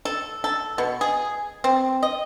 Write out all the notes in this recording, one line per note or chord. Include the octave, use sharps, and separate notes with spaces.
A4
A4
B2
G#4
C4
D#5